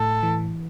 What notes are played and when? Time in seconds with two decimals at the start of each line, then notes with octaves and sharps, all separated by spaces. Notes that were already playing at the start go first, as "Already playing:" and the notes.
Already playing: A2 A4
0.23 E3